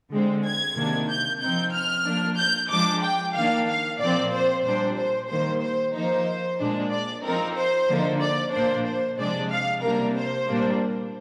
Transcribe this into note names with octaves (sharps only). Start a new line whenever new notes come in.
D3 G#3 C4
G#6
C3 D#3 A#3 D4
G6
F3 C4 D#4 G6
F6
F3 A#3 D4
G6
F3 G#3 D4 D6
G5
D#3 A#3 D4 F5
F5
A#2 F3 C4 D5
C5
A#2 G3 D4 C5
C5
D#3 G3 A#3 C5
C5
F3 A#3 D#4 C5
A#2 G#3 D4
D5
F3 C4 D#4 A#4
C5
D3 F3 A#3 D#4
D5
A#2 F3 A#3 D4 C5
C5
C3 F3 G#3 D4 D5
F5
C3 G3 A#3 D4 A#4
C5
A#2 G3 A#3 D4